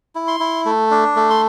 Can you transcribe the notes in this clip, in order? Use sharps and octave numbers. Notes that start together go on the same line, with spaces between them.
E4
C6
E4
A3
D4
A3
C6